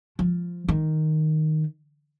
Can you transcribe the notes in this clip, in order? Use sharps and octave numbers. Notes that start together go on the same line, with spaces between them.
F3
D#3